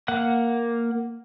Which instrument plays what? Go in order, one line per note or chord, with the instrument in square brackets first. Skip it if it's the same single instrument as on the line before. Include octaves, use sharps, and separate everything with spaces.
[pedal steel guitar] A#3 F#5 F#6